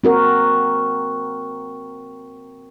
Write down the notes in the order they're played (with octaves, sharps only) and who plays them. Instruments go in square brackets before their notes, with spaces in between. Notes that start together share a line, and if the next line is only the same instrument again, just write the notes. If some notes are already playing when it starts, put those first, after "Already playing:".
[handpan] C4 F#4 A#4